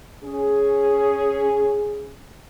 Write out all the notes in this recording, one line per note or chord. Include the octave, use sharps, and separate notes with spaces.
C#4 G#4